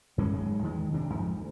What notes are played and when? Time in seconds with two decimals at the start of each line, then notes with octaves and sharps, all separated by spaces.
0.18 F#2 G#3 A#3 C#4
0.32 F#1 G#2 F#3 G#3
0.62 E2 D#3 E3 G#3
0.90 D1 D2 C3 D4
1.11 F2 G#2 F3
1.38 D2